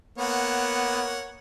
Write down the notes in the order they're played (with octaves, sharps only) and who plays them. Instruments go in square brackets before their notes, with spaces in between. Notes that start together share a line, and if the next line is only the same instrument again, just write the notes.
[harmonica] A#3 C#5 F#5 [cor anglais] B3